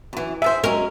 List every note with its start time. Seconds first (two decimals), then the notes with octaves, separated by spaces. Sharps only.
0.13 F#2 E3
0.42 G#4 A4 C5 E5
0.64 F#3 G#3 C#4 A#4